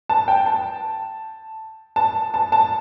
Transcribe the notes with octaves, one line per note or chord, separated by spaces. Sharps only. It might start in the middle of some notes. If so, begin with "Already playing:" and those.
A5
G5
A5
A5
A5
A5